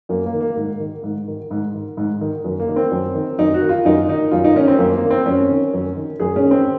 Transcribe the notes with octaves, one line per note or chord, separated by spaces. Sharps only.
F#2 A#3
A#3
D#3
A#3
G#2
D#3
G#2
D#3
G#2
D#3
G#2
D#3
F#2
A#3
D#3
C4
F#2
D#3
F#2 D#4
F#4
D#3
F4
F#2 D#4
D#3 D#4
F#2 F4
D#4
D#3 C#4
C4
F#2 A#3
A#3
D#3
C4
F#2 C#4
D#3
F#2
D#3
F#2 G#4
C#4
D#3
C4